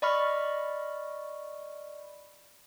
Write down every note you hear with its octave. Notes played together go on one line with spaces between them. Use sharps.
D5 D#5 B5 C#6 F6